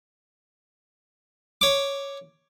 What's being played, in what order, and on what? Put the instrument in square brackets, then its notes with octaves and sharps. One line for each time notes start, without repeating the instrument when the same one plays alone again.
[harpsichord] C#5 D6